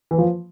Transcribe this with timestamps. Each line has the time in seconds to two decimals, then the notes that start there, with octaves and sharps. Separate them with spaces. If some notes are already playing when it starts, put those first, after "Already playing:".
0.11 E3
0.18 F3